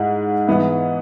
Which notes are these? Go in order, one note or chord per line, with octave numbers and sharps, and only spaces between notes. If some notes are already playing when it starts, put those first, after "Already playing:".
Already playing: G#2 G#3 E4
G#2 E3 B3 E4